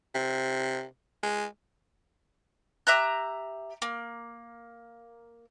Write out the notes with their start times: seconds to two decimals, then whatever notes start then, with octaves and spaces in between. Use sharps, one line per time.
0.14 C3
1.23 G#3
2.87 G4 E5 A#5 F#6
3.82 A#3